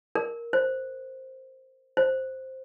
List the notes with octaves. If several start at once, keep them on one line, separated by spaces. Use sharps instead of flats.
A#4
C5
C5